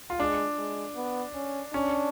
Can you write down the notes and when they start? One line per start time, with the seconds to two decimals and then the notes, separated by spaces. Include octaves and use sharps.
0.10 F4
0.19 G#3 D4
0.58 G#3
0.96 B3
1.35 C#4
1.74 C#4 D4